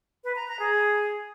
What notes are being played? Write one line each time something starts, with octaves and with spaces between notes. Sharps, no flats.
B4
A#5
A#5
G#4